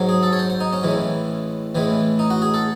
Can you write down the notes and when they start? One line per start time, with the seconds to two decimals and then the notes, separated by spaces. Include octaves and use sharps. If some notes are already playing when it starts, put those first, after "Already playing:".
Already playing: G#2 F#3
0.09 G#4
0.23 A4
0.33 C#5
0.39 C5
0.50 C5
0.60 D#4
0.73 C#4
0.83 A1 A2 E3 G#3
1.75 A1 A2 E3 G#3
2.19 D#4
2.30 F#4
2.42 G#4
2.54 A4